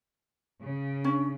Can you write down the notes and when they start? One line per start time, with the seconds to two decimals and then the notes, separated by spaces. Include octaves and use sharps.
0.63 C#3
1.04 C#4 D4